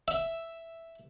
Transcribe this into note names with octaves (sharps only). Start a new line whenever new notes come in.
E5